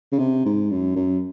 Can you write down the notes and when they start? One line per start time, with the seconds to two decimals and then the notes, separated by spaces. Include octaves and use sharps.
0.12 C#3
0.19 C3
0.45 G#2
0.71 F#2
0.96 F#2